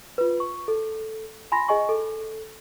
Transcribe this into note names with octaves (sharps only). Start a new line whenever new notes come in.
F4 B4
C#6
A4
G#5 B5 C6 A#6
G#4 D#5 G#5 C#6
A4